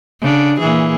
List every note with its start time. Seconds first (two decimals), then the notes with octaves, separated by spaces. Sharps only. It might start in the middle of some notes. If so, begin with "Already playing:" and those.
0.21 C#3 D4
0.59 A#2 E3 G#4